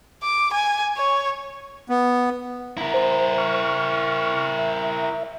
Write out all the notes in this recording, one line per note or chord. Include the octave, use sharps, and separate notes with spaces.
D6
G#5
C#5
B3
E4 A#4 A#5
C5
C#6 F6
E5